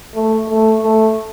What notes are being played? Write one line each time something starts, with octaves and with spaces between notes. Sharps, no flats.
A3
A3
A3